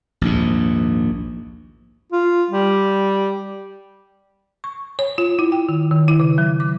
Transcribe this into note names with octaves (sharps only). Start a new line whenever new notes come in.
A#1 D#2 G#2
F4
G3
C#6
C#5
F4
E4
G5
D#3
D#3
E4
C#3
F#3
D6